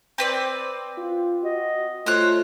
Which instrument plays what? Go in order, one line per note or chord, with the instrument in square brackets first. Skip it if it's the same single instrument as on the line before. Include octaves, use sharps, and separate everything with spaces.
[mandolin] C4 B4 D5
[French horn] F4
[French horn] F#4 [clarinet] D#5
[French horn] A3 [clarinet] F4 [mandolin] C5 C#5 F#6